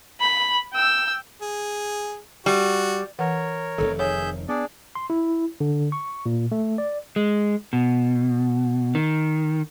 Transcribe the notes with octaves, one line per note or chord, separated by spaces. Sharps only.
B5
G5 E6
G#4
G3 F#4
E3 A#4 C#5 F#5
F1 B1 D#3 A4
G#4 C#5 E5 G6
B3 D4 G#4 D5
C6
E4
D3
C#6
A#2
A3
D5
G#3
B2
D#3